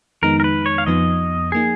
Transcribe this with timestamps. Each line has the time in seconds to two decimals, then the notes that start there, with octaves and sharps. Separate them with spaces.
0.22 F2 D#3 G#3 B3 D#4 A#4
0.40 A#4
0.44 B4
0.66 C#5
0.78 F5
0.86 F2 F3 B3 D#4 D#5
1.52 F3 A#3 D#4 G#4